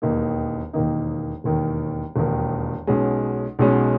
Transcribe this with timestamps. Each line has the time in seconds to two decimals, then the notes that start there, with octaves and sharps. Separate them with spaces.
0.02 E1 D#2 D#3 A#3 D#4
0.73 E1 D#2 D#3 A#3 D#4
1.44 E1 D#2 D#3
2.16 E1 D#2 D#3
2.87 B1 B2 G#3 C#4
3.59 B1 B2 G#3 C#4